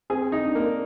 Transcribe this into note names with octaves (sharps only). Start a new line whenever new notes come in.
C4 G#4
D#4
D4
A#3